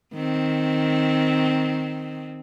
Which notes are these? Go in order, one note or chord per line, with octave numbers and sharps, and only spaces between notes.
D#3 C4